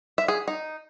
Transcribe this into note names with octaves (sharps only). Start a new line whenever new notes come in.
E5
G#4
D#4